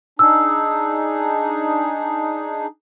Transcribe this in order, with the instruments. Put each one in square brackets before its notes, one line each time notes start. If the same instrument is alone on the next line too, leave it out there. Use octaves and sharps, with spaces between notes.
[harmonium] D4 D#4 G#4 [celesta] E6